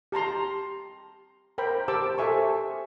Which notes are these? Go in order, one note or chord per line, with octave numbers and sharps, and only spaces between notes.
G4 A5 A#5 C6
A#4 C5 G5 B5
G4 C5 G5 A5 D6 E6
G4 A4 C5 E5 G#5 C#6